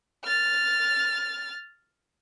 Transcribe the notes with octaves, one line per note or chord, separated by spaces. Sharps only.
F6 A6